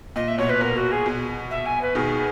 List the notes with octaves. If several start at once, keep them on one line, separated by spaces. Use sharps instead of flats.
A#2 D#5
E5
B2 C#5
B4
B2 A#4
F#4
G#4
B2
E5
G#5
B4
B2 D#3 G#4